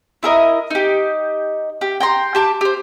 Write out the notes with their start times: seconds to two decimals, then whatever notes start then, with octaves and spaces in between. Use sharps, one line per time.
0.23 E4 A4 A#4 D#5
0.71 D#4 G4
1.81 G4
2.00 G5 A#5 C6
2.35 G4 A5 D6
2.61 G4 C5